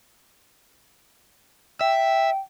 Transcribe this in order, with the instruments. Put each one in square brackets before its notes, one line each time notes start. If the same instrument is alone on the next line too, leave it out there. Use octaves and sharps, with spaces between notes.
[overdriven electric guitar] E5 [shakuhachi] G5